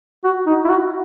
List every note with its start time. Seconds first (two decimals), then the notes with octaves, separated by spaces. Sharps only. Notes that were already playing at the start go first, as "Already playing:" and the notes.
0.24 F#4
0.46 D#4
0.65 E4
0.69 F#4